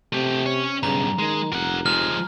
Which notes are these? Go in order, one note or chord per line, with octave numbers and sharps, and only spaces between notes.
C3 A3 G4
C#4 C#5
B1 G2 C#3 A#5
D#3 G#3
F1 A#4 F#5
F3 G#3 F6